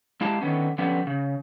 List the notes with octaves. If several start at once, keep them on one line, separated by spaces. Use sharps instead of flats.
G#3 E4 G4 F5 A5
D3 D#3 B3 C#4
D3 F3 G3 B3 C#4
C#3